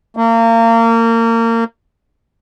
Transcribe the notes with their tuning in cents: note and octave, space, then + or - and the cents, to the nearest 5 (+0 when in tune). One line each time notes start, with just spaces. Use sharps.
A#3 -30